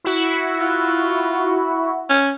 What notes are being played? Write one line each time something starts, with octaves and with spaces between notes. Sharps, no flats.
E4 F#4
F4
C#4